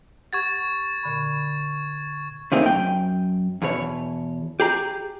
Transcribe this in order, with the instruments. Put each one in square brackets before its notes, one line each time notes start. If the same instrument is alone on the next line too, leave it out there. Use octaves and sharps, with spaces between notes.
[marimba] G4 F#5 [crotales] C#6 G#6 A6
[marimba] A#2 D3 B5
[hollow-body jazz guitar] A2 C3 A#3 C4 D#4 G#4
F#2 G5
E2 B2 C#5
G4 G#4 A#5